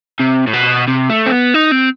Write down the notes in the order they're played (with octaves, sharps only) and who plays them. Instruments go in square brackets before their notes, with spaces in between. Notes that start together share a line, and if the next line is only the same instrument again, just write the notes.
[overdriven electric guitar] C3
A2
B2
C3
A3
C4
B3
D#4
C4